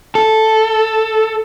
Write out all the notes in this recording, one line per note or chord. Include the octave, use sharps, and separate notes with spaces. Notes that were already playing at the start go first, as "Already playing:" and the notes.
A4